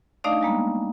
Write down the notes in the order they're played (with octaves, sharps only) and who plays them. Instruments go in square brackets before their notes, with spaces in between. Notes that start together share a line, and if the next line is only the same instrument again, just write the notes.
[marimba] A3 D4 D#4 D5 D#5 F5
G3 G#3 A#3 B3